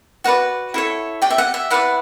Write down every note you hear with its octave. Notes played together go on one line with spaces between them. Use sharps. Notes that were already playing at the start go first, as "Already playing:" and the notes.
F#4 B4 D5 F#5
E4 A4 C#5
G4 D5 G5
E5
F#5
E5
E4 B4 D5 F#5